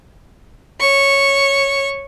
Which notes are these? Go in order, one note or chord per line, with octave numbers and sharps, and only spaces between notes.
C#5 C#6